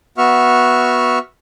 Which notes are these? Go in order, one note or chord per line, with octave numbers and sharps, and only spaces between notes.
B3 F#4 E5 C#6 F6